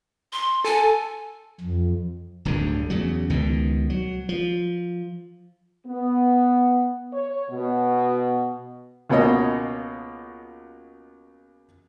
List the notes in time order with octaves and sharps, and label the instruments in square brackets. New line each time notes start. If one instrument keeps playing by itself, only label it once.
[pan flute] C6
[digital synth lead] A4 [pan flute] G#5
[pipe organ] F2
[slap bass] D1 D2 G2 D3
E2 C#3 F#3
C#2 B2 D#3
F#3
F3
[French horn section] B3
C#5
B2
[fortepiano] C#2 B2 A#3 C#5 D#5